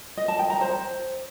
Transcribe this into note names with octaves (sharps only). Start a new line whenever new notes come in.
D#5
A5
G5
A#5
C5